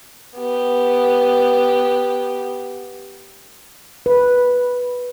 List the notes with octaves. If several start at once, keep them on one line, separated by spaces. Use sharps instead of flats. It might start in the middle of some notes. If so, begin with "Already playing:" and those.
B3 G4
B4